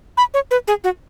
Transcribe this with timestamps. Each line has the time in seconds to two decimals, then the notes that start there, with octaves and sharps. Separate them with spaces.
0.17 B5
0.34 C#5
0.51 B4
0.68 G#4
0.84 F#4